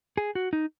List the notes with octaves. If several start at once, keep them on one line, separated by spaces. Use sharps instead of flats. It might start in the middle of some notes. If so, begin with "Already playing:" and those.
G#4
F#4
D#4